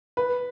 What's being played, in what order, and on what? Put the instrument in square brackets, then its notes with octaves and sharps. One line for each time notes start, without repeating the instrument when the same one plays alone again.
[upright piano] B4